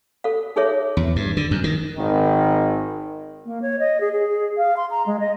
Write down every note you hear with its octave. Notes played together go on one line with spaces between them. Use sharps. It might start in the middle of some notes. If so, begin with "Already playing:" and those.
A4 F5
D#4 G#4 A4 C#5 E5
E2
G2
D3
F#2
D#3
G#1 D#3
A#3
C#5
D#5
G#4
G#4
F5
C6
A#5
G#3
D#5